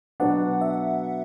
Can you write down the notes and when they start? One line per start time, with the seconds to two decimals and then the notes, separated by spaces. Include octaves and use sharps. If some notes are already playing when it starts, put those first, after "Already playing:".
0.20 B2 F#3 B3 D4 F#5
0.61 E5